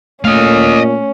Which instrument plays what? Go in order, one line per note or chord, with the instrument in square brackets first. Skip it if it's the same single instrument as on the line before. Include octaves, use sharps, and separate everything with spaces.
[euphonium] A#2 [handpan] A3 [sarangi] C#4 [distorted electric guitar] D#5 F5